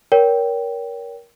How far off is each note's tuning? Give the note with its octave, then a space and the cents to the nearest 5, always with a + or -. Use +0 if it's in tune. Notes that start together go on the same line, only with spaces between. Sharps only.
A#4 +20 C#5 +25 G5 -5